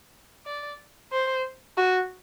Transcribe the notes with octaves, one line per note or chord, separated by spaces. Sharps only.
D5
C5
F#4